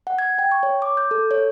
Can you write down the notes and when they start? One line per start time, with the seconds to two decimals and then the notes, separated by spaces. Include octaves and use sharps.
0.07 F#5
0.19 G#6
0.39 G5
0.52 C#6
0.63 C#5
0.82 D6
0.97 G6
1.11 A4
1.31 C#5